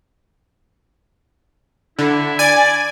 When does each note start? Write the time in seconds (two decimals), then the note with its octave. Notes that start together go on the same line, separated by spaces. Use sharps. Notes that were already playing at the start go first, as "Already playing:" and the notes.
1.99 D3 E4
2.39 D5 G#5